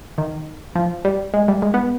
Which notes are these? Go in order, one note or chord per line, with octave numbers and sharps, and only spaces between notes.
D#3
F3
G3
G#3
G3
G#3
B3